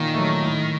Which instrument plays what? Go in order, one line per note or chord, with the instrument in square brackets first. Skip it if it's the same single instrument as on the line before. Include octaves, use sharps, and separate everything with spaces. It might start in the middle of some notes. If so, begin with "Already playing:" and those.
Already playing: [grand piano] A#2 [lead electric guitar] D#3
[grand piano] F#3 A3
A2